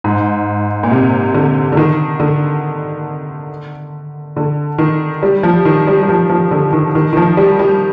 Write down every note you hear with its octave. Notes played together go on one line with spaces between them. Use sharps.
G#2
A#2
C3
D3
D3
D#3
D3
D3
D#3
G3
F3
D#3
G3
G3
F3
F3
D3
D#3
D#3
D#3
F3
G3
G3